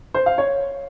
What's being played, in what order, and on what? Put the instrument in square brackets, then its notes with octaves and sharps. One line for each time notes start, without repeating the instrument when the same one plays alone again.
[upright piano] C5
F5
C#5